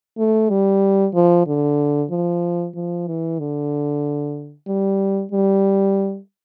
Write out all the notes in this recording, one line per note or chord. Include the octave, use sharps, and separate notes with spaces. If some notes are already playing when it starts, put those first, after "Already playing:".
A3
G3
F3
D3
F3
F3
E3
D3
G3
G3